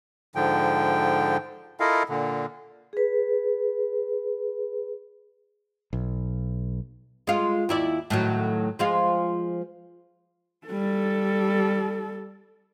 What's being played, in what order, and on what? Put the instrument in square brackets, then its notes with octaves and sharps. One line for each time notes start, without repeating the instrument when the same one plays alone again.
[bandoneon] G#2 D3 F3 G5
E4 F4 A4 A#4 D#5 F5
A#2 D3
[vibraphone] G#4 B4
[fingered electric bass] B1
[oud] G#3 F4
D#2 E4 D5
A2 D#3 F#3
F3 G#3 F4
[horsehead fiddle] G3 A4